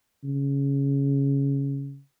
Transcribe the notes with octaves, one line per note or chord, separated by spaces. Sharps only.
C#3